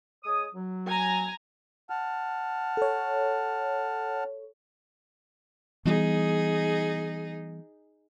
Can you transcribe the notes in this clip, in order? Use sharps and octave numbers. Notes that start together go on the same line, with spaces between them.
G#3 C#5 D#6
F#3
G#5 A#5
F#5 A5 F6
A4 C#5
E3 G3 B3 D#4 G#4